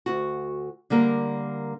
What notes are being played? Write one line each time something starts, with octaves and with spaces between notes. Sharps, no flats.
D2 F#4
D3 G3 A#3 A#4